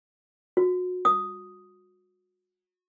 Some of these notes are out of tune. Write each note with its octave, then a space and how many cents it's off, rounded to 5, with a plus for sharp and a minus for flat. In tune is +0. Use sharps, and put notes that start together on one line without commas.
F#4 -30
D#6 +0